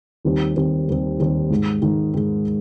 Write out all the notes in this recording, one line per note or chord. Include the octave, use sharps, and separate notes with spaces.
D#2 D#3 G3 C4
D#2 D#3 G3 C4
D#2 D#3 G3 C4
D#2 D#3 G3 C4
G#2 D#3 G#3
G#2 D#3 G#3
G#2 D#3 G#3